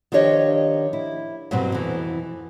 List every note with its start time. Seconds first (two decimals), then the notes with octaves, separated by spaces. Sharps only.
0.12 D#3 F3 D4 G4 C#5 D#5
0.93 E4
1.51 G2 B2 F#3 C4
1.72 F2 E3